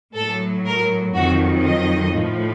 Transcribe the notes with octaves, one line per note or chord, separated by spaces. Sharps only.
A2 F#3 A4
A#4
F2 D#3 F#3 F#4
D#5
A2 F3